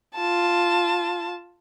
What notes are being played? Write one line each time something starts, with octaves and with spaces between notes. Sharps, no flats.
F4 A5